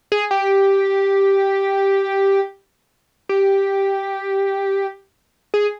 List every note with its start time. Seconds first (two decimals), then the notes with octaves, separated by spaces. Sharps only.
0.12 G#4
0.31 G4
3.29 G4
5.54 G#4